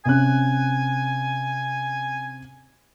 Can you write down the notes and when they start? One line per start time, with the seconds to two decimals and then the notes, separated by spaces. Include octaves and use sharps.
0.05 C3 C#4 G#5 F#6